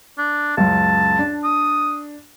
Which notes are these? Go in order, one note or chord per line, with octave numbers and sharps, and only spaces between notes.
D4
C#2 F#2 A5
D4
D#6